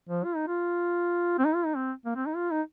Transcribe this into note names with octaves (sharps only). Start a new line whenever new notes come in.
F3
F4
D#4
F4
C4
D#4
F4
D#4
C4
A#3
C4
D#4
F4
D#4